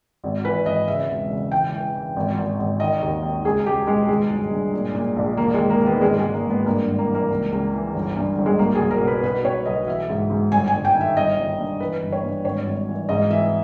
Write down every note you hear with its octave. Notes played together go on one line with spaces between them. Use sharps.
G#1
E3 B4
G#1 D#5
C#3 E5
E1
C#3
E3 G5
E3
E3
G#1
G#1
G#1
D#3 D#5
D#2
D#3
C#2 G#4
C#2 G4
B2 G#3
D#3 G#3
G1
G2
A#2
A#2
A#1
E1 A#3
D#3 G#3
A#3
D#3
B3
G#1 G#3
G#3
G#2
A#3
G#2
B3
G2 A#3
G#1
A#3
E3
A#3
C#2
C#2
E3
G1
G2
G1
G#3
B1 A#3
G#4
B1
A#4
B2
B4
B2 B4
B2 C#5
B1 D#5
E3 E5
G#2
G#2
G1 G#5
G#5
G1
G5
D#3
E5
G1 D#5
G1
G2
E3 B4
G1
C#5
G2
G#1 C#5
G#1
E3
G#2 D#5
E3 E5